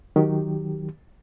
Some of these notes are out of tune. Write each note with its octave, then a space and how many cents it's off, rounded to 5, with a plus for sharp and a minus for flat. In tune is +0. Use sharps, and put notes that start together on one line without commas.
D#3 +0 F#3 +0 G4 +0